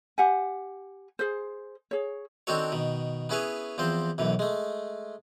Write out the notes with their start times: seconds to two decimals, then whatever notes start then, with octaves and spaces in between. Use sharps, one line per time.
0.18 G4 F#5 G#5
1.19 G#4 C5
1.91 G#4 C#5
2.47 D#3 C4 D4 F#4 A4 C#5
2.72 B2 D#3
3.29 B3 C#4 E4 G#4 B4 C#5
3.78 E2 F3 C4 C5
4.18 B1 F#2 E3
4.39 G#3 A3